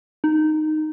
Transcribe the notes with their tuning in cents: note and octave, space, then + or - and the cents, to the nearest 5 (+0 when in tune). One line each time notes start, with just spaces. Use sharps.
D#4 -10